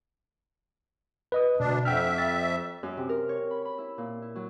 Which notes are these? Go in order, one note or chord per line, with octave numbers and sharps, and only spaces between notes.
B4 D#5 D#6
D2 B2 D4
F2 E5 F#5 G5 F6
A6
F#2
C3
A#4
C#5
B5
B5
E4
A#2
E4
F#3